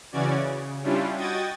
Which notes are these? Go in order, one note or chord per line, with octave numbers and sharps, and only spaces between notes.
C#3 E3 C#4 F#4 D5 G#6
C#3
G3 C#4 D4 E4 F4
F#4 D#5 G5 D#6 G#6 A6